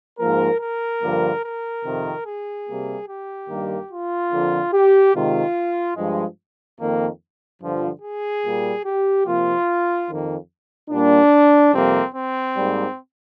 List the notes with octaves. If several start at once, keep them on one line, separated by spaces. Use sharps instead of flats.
G#2 F3 A#3 A#4
A#4
G2 D3 F3 A#3
A#4
F2 C3 D#3
G#4
C3 G3 A#3
G4
G2 D#3 G3 A#3
F4
F2 D3 F3 A#3
G4
C3 D#3 G#3 F4
G2 F3 G#3
F2 D#3 A#3
G2 D3 F3
G#4
A#2 G3 A#3
G4
C3 F3 A#3 F4
F2 D#3 A#3
A#2 G3 A#3 D4
F2 C3 G3 A#3 C4
C4
G#2 G3 A#3